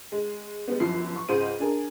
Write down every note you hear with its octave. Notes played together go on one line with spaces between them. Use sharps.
G#3
G3 G#3 B3
G1 F#2 F3 C7
C#6
C#2 G#2 C#3 C5 D#7
D4 G#4 A#4